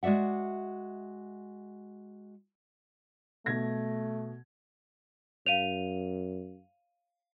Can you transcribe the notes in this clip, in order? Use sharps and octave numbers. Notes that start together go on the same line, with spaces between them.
G#3 F#4 D5 E5 F#5
B2 A3 G#6 A#6
F#2 C#5 F5 D#7 F7